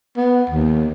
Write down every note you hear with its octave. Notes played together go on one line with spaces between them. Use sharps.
B3
D#2